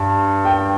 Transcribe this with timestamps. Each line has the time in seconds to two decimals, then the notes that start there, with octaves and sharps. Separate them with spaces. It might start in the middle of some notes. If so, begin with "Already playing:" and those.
Already playing: G2
0.45 G5